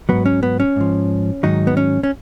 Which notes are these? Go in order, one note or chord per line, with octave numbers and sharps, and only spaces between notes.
G#2 F#3 B3
C#4
B3
C#4
G#2 F3
G#2 D#3 F#3 D#4
B3
C#4
C#4